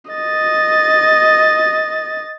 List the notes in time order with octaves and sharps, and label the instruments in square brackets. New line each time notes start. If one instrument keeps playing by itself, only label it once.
[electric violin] D#5 A6